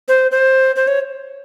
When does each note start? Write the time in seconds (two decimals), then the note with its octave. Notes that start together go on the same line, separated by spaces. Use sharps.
0.08 C5
0.31 C5
0.76 C5
0.87 C#5